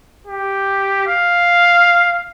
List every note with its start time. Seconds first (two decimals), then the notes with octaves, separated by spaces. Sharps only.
0.27 G4
1.07 F5